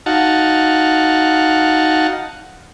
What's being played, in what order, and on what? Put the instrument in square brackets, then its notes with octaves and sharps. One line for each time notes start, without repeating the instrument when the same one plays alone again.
[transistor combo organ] D#4 F#4 F5 F#5 A5